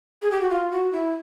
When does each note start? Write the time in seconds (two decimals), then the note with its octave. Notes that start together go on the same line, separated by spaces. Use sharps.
0.22 G#4
0.31 G4
0.41 F#4
0.50 F4
0.72 F#4
0.92 E4